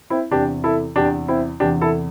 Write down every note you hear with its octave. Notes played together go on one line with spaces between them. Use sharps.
C4 E4
E2 C3 E3 D4 G4
E4 A4
E2 C3 E3 D4 G4
C4 E4
E2 C3 E3 D4 G4
E4 A4